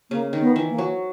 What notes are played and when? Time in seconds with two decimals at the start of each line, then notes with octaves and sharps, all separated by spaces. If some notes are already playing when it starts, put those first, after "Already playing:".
0.10 C#3 A#3
0.33 D#3
0.41 B3
0.56 E3
0.70 A#3
0.78 F#3